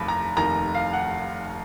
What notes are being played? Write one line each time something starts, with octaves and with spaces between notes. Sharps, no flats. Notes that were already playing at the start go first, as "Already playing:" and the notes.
Already playing: F1 D#2 B5
A#5
F1 D#2 D#3 A#5
F5
F#5